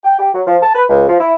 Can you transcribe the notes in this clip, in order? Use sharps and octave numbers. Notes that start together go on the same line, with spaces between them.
G5
G4
F#3
F3
A5
B4
C#2
F3
E4